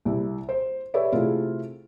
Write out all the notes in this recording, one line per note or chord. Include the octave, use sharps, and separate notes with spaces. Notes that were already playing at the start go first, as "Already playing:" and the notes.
C2 E4
C5
G4 A4 B4 C#5 D5 E5
C3 A3 E4 F4 G#4 A4